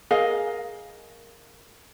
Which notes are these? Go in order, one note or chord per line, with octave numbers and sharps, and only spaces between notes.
G#4 A#4 D#5 F5